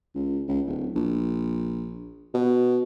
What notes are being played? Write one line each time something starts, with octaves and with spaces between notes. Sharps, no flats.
C#2
C#2
D1
A#1
B2